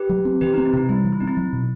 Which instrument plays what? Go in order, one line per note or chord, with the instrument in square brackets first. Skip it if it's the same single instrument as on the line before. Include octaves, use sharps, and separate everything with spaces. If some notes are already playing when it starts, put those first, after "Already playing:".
Already playing: [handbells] G4 B4
[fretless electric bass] F#3
C4
[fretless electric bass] E3 [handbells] G4 B4
[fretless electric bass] C4 [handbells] D#4
[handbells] E4
[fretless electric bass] C3 [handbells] D#4
[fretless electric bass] G3 [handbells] E4
[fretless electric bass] E3
[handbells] E4
[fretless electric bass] C4 [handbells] D#4
[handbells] E4
[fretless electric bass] F#3
B2